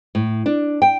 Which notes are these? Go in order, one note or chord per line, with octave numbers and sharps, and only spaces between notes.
A2
D4
G5